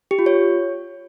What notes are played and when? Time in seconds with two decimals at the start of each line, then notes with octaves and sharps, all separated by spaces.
0.11 G4
0.19 F4
0.26 C#5